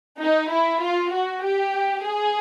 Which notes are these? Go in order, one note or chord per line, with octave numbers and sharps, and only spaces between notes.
D#4
E4
F4
F#4
G4
G#4